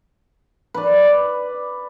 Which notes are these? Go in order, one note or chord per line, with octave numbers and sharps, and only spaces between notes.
B4 D5